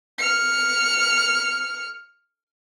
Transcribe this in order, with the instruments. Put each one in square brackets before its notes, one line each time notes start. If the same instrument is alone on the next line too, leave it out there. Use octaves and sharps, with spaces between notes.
[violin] F6 C#7